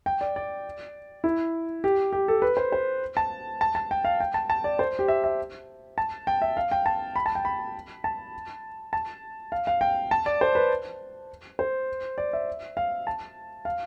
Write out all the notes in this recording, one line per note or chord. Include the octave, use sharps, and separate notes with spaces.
G5
D5
D5
E4
G4
G4
A4
B4
C5
C5
A5
A5
A5
G5
F5
G5
A5
A5
D5
C5
G4
E5
E5
A5
G5
E5
F5
G5
A5
B5
A5
G5
B5
A5
A5
F5
F5
G5
A5
D5
C5
B4
C5
D5
E5
F5
A5
F5